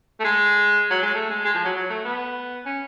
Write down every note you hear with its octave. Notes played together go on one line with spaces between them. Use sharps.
A3
G#3
F#3
G#3
A3
G#3
G#3
F3
F#3
F#3
A3
B3
C#4